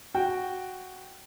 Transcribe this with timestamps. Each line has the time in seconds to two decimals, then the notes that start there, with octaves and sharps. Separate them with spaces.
0.14 F#4 G5